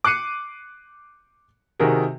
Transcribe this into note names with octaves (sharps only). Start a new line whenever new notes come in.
D6 F#6 C7 C#7 D#7
C3 D#3 F#4 G#4 A#4